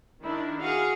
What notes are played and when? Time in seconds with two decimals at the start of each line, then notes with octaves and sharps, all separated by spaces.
0.23 D#3 D4 E4
0.61 F#4 G#4 F5